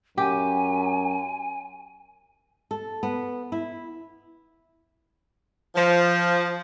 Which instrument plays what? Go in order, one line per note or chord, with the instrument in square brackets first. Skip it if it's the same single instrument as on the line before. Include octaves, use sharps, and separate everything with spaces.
[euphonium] F#2 [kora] G4 [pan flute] G#5
[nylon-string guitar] A4
B3
E4
[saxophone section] F3